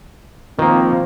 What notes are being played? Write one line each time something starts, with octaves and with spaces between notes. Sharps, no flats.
D#3 F3 A#3 C4